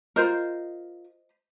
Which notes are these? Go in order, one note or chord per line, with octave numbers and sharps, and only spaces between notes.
F4 A#4 C5 D#5